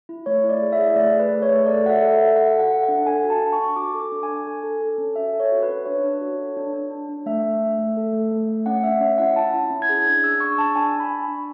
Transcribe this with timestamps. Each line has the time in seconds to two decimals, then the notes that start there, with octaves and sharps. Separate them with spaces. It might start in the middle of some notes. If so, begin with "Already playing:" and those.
0.09 E4
0.26 A3 C#5
0.44 E4
0.49 D5
0.61 G#4
0.72 E5
0.79 G#4
0.96 A3 D5
1.14 G#4
1.19 B4
1.31 A3
1.42 C#5
1.49 A3
1.66 A4 D5
1.84 F#4 F#5
1.89 E5
2.02 A4
2.12 E5
2.19 A4
2.36 A4 F#5
2.54 F#4 F#5
2.71 A4
2.83 F#5
2.88 D4
3.06 A4 G#5
3.24 F#4
3.30 A5
3.41 F#4
3.53 C#6
3.59 D4
3.76 F#4 D6
3.94 A4
4.00 D6
4.12 D4
4.23 G#5
4.28 D4
4.47 A4
4.63 A4
4.81 A4
4.98 C#4
5.16 F#4 E5
5.33 A4
5.40 C#5
5.51 F#4
5.63 B4
5.69 C#4
5.86 D4 C#5
6.04 D4
6.21 F#4
6.39 A4
6.57 D4
6.73 D4
6.91 D4
7.09 D4
7.26 A3 E5
7.44 A3
7.61 A3
7.78 A3
7.97 A4
8.13 A3
8.31 A3
8.49 A3
8.66 C#4 F#5
8.83 C#4 E5
9.01 C#4 E5
9.18 E4 F#5
9.36 E4 A5
9.53 E4
9.70 C#4
9.82 G#6
9.89 G#4
10.06 D4 G#6
10.23 G#4 E6
10.40 D4 C#6
10.58 D4 A5
10.76 D4 G#5
10.93 D4
11.00 B5
11.11 D4
11.28 D4